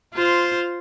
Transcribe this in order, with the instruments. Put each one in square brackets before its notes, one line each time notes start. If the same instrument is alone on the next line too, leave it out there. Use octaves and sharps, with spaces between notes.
[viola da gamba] F4 C5